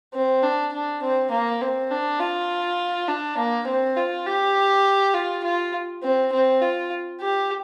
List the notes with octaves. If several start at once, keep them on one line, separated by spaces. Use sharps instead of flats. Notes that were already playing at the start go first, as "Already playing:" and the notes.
C4
D4
D4
C4
A#3
C4
D4
F4
D4
A#3
C4
F4
G4
F4
F4
C4
C4
F4
G4